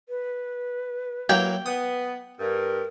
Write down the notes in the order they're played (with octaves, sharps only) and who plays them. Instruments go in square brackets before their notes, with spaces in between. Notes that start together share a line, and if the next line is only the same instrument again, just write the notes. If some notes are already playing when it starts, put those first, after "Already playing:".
[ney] B4
[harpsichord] F#3 A#3 E4 [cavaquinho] G5
[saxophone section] B3 [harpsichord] D#6
[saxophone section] G2 [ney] A#4